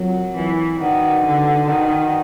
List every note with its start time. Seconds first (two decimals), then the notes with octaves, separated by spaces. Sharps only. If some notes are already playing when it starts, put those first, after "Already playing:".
Already playing: F#3 C4 F4 A#4 C#5 F#5
0.37 E3
0.80 D#3 D#4 F#4 B4 D5 F#5
1.25 D3
1.67 D#3